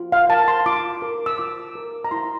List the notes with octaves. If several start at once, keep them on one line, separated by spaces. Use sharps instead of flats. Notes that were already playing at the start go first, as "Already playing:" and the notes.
Already playing: F4
F5
A#4 A5
C6
F4 D6
A#4
E6
F4 D6
A#4
A#5
E4 C6